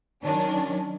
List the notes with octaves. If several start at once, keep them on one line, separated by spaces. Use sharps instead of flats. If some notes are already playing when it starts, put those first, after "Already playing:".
D#3 F#3 C#4 D4